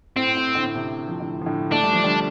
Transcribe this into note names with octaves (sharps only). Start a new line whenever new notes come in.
A2 C4
A2
A2 D3
C3
F3
A2 D3
F3
A2 D3
A3 D4
G3
F3
D3 G3